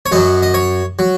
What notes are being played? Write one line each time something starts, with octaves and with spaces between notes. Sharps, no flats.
C#5
F#2 F#3 D#5
D#5
C#5
F#3